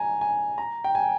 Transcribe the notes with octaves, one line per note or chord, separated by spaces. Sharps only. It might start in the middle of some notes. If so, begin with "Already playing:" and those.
Already playing: G#5 A#5
G#5
A#5
G5
G#5